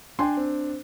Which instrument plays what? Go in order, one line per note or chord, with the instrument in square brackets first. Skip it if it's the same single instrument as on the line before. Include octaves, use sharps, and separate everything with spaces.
[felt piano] D4 [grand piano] G5 G#5 C6
[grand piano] C4